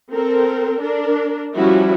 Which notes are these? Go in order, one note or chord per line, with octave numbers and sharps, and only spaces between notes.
C4 A4 A#4
D4 A#4
F3 G3 C#4 E4 F#4